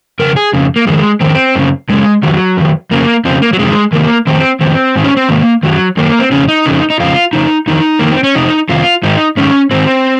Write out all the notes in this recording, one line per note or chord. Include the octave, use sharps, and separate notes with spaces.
F2 C#3 A#4
G#4
F2 C#3
A#3
F2 D#3 G#3
F2 D#3 C4
F#2 C#3
F#2 C#3 G#3
F2 D#3 F#3
F2 D#3
F2 C#3 A#3
F2 C#3 C4
A#3
F#3
F2 C3 D#3 G#3
F2 C3 D#3 A#3
F2 D#3 C4
F2 D#3 C4
G#2 D#3
C#4
C4
G#2 D#3 A#3
F#2 D#3 F#3
F#2 D#3 A#3
C4
F2 C#3 C#4
D#4
F2 C#3
D#4
F2 C#3 F4
F2 C#3 D#4
F2 D#3 D#4
F2 D#3 A#3
C4
C#4
F2 C3 D#4
F2 C3 D#3 F4
G#2 D#3 D#4
G#2 D#3 C#4
G#2 D#3 C4